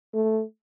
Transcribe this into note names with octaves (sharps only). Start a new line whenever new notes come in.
A3